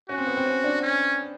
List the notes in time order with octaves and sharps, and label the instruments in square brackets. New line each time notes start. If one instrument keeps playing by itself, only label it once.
[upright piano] C#4 [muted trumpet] F#4
[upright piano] C4
B3
C4
C#4
D4
[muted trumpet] C#4